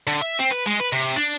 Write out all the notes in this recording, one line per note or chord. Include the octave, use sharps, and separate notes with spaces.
D3
E5
C4
B4
G#3
B4
C3
D4